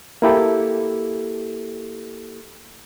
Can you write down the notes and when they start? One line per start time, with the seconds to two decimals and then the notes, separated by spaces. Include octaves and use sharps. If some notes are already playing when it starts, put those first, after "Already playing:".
0.22 A#3 E4 G4 A4